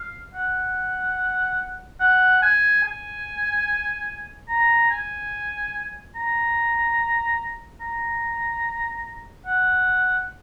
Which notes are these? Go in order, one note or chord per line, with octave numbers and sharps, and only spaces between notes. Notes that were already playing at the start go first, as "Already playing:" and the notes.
Already playing: F5
F#5
F#5
G#5
G#5
A#5
G#5
A#5
A#5
F#5